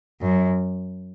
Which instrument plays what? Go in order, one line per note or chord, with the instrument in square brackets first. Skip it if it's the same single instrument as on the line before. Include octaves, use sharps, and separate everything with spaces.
[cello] F#2